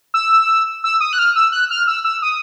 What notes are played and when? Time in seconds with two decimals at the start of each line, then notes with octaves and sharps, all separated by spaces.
0.14 E6
0.84 E6
1.01 D#6
1.13 F#6
1.19 F6
1.36 E6
1.52 F#6
1.70 F6
1.87 E6
2.04 E6
2.22 D#6